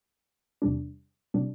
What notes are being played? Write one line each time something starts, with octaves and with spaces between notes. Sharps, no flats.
E2 C3 G3 D4
C3 G3 D4